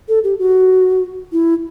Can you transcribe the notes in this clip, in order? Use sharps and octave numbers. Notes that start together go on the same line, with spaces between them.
A4
G4
F#4
E4